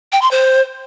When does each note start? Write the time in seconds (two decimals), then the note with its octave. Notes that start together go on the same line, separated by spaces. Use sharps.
0.12 G5
0.22 C6
0.31 C5